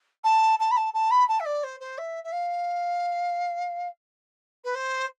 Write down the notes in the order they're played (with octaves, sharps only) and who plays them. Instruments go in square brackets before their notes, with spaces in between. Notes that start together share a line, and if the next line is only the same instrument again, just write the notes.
[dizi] A5
A5
B5
A5
A5
B5
A5
E5
D5
C5
C5
E5
E5
F5
B4
C5